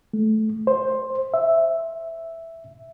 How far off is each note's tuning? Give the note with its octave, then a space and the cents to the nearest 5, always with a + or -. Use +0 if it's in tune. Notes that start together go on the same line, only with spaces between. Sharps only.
A3 -20
C5 +10
E5 +0